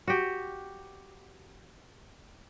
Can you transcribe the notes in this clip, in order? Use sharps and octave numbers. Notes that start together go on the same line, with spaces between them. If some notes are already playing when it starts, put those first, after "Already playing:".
F#4 G4